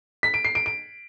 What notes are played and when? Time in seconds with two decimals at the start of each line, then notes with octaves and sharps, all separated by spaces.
0.23 B6
0.34 D7
0.45 C7
0.55 D7
0.66 D7